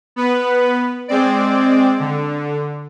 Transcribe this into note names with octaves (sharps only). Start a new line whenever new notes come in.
B3 B4
G#3 C4 D5
D3